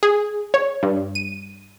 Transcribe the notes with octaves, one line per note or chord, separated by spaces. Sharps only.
G#4
C#5
G2
D#7